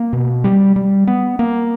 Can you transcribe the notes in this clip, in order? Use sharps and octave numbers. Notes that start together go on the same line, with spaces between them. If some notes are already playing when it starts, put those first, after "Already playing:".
Already playing: A#3
B2
G3
G3
B3
A#3